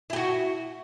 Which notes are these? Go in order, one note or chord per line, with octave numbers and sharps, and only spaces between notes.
E4 F#4 G4